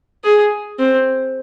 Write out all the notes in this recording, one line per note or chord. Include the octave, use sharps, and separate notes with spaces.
G#4
C4